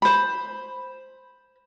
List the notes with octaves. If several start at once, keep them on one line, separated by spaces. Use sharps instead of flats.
C5 B5